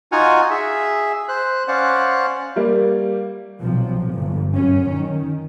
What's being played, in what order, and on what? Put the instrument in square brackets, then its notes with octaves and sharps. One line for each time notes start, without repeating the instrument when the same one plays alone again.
[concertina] D#4 F4 F#4 F#5 G#5 F6
G#4 E5
C5 F#6
C#4 C5 D5 F5 F#5 F#6
[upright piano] G3 A#3
[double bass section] B1 C3 F3
G1 G2
F#2 C#4
D#3